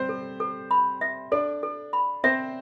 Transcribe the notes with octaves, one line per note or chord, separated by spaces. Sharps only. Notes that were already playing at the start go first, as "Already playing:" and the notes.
Already playing: G3 C4 G4 C5
A4
A4
B5
E5
D4 A4 D5
A4
B5
C4 C5 E5